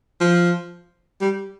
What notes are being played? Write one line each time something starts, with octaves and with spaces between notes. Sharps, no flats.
F3
G3